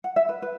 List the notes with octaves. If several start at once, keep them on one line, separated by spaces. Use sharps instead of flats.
F#5
E5
B4
B4